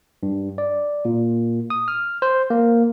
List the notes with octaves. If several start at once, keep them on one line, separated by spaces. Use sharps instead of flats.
G2
D5
A#2
D#6
F6
C5
A#3